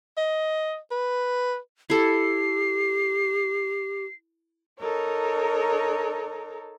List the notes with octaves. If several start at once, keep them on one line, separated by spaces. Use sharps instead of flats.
D#5
B4
E4 G4 A4 C7
D#4 A4 A#4 C#5